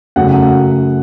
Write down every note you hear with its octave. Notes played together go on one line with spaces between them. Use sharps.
F#2 C#3 F#3 A3 F#5